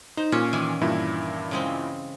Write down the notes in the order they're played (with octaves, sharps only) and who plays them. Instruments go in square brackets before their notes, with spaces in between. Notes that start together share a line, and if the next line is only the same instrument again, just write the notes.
[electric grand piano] D#4 [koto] C5
[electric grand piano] A#2 [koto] C#4
[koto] D#3 E3 G#5
[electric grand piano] G2 A#2 E4
[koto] C#3 G#3 C4